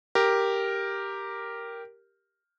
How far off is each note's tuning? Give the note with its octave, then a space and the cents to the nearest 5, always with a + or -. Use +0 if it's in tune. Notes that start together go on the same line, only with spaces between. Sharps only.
G4 +0 A#4 +0